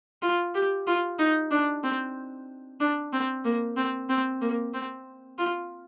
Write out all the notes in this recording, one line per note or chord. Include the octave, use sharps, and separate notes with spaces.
F4
G4
F4
D#4
D4
C4
D4
C4
A#3
C4
C4
A#3
C4
F4